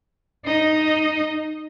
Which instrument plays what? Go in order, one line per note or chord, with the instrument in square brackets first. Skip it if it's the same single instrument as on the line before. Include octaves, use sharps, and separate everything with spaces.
[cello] D#4 D#5